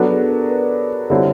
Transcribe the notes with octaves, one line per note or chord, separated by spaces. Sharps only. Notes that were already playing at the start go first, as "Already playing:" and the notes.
Already playing: F#3 B3 D4 A4
G#4
A#4
B4
D3 G3 C4 E4 A4 C#5